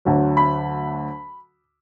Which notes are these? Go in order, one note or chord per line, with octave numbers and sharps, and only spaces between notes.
D2 D3 F#3
B5